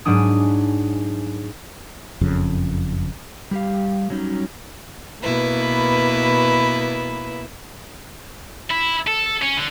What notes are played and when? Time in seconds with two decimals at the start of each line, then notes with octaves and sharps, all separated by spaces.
0.05 G#2 F#3 G#3 D4 D#6
2.21 F#1 F2 C#3
3.51 G3 G4 F5
4.10 F#3 G3 C#4 D#4
5.23 B2 A#3 E4 B4
8.70 E4
9.07 A4
9.42 C#4
9.57 D3